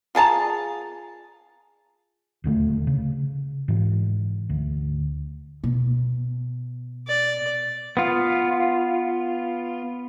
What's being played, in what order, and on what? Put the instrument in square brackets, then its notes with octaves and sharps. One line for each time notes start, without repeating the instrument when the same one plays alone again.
[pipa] F4 G#4 A5 A#5
[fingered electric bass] D#1 D2 G#3 A3
C#3
G#2 E3
D2
[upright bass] B2
[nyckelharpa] D5
[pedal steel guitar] B3 F4